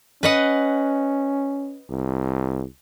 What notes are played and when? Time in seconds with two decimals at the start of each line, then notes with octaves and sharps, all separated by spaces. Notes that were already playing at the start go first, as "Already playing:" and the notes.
0.23 C#4 B4 D#5 F#5
1.90 C2